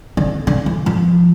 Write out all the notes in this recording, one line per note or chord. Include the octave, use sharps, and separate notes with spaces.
D3
D3
E3
F3